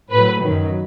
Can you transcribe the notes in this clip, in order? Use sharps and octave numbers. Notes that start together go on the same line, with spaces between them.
A2 F#3 B4
F#2 D#3 F#3